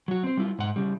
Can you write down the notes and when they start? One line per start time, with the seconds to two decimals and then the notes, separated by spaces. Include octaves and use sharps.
0.08 F#3 F#4
0.23 C4 C5
0.37 G3 E4 F4
0.59 G#2 F#5
0.76 C#3 G3